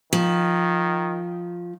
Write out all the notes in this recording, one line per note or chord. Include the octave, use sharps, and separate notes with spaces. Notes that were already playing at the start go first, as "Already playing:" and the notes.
D#3 F3